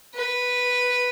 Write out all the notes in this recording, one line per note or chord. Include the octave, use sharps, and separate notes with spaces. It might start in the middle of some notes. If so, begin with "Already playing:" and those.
B4